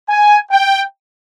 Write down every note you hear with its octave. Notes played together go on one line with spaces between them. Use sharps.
G#5
G5